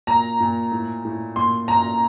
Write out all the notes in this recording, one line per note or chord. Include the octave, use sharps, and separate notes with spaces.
A#2 A#5
A#2
A2
A2
A#2 C6
A#2 A#5